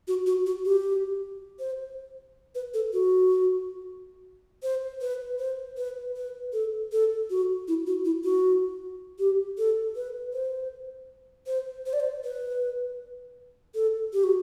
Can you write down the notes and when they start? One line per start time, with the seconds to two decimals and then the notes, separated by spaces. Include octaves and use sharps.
0.08 F#4
0.26 F#4
0.46 F#4
0.65 G4
1.59 C5
2.55 B4
2.74 A4
2.93 F#4
4.63 C5
5.01 B4
5.39 C5
5.77 B4
6.16 B4
6.53 A4
6.92 A4
7.30 F#4
7.68 E4
7.87 F#4
8.05 E4
8.24 F#4
9.19 G4
9.58 A4
9.96 B4
10.33 C5
11.47 C5
11.86 C5
11.93 D5
12.00 C5
12.24 B4
13.75 A4
14.13 G4
14.23 F#4